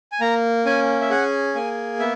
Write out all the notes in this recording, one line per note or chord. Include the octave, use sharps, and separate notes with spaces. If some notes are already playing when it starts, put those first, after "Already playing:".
G#5
A#3 A#5
C#4 G#5
E5
G#4 F#5
A#3 G#5
B3 E5